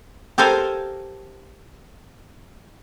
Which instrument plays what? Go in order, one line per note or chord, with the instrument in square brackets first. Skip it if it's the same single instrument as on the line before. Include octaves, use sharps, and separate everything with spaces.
[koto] G4 A4 A#4 C5 F5 G#5